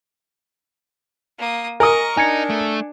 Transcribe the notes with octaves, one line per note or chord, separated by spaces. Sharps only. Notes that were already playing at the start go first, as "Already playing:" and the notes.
A#3 D#6
A#4 D#5 G#5 C#6 D#6
D4 D#4 G#5 G#6 C#7
A3